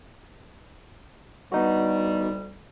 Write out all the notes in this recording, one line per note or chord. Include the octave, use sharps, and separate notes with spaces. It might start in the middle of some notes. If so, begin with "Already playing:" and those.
D2 G3 B3 D#4 F#4